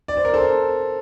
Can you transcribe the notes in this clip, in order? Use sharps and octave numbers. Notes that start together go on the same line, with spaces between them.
D5
C5
A#4
A4 C5